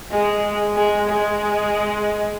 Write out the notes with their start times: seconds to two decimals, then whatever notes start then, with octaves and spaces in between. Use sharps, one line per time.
0.11 G#3
0.76 G#3
1.08 G#3